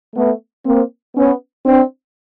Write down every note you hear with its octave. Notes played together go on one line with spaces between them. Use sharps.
A3 B3
A#3 C4
B3 C#4
C4 D4